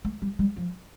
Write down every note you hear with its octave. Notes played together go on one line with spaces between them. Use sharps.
A3
G3
G3
F3